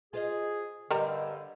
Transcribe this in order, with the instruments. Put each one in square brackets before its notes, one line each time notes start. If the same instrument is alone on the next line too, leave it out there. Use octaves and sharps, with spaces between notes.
[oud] F4 C5 D#5 [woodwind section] G#4
[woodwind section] G2 D3 [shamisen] G3 A#4 [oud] C#5 D#5